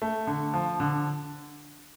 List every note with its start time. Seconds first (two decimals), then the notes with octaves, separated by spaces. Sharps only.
0.02 A3
0.27 D3
0.54 F3
0.80 D3